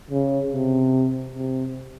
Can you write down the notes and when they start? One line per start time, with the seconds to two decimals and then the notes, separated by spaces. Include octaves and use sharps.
0.11 C#3
0.52 C3
1.35 C3